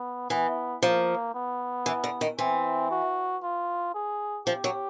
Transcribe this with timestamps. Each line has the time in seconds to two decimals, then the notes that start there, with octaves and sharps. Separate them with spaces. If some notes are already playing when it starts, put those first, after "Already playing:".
Already playing: B3
0.30 E3 B3
0.82 F3 A#3
1.34 B3
1.86 E3
2.04 D3
2.21 D#3
2.38 E3 C4
2.91 F#4
3.42 F4
3.94 G#4
4.46 F3 G4
4.64 F#3